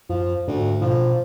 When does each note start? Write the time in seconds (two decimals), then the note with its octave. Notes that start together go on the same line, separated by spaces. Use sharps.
0.09 F#2 F3
0.47 D2 G#2
0.81 B2 F3